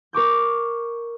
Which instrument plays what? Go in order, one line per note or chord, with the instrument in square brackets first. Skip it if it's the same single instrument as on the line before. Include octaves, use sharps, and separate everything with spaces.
[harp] A#4 C#6 D6 G6